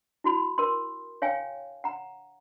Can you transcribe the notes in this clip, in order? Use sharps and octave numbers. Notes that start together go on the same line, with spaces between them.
E4 F#4 B5
A#4 C6
C#5 F5 G5 G#5
F#5 A#5